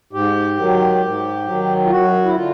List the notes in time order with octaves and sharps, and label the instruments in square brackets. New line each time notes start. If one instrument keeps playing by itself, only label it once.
[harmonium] G#2 G4
D#3 F#3
G#2
D#3 F#3
F4
F#2 F#4
E4
D3 F4